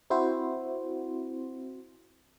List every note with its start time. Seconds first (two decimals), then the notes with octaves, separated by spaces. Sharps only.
0.10 C4 E4 F#4 C5